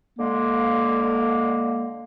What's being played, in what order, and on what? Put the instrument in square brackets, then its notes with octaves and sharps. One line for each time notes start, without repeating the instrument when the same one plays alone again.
[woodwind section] D3 G#3 A#3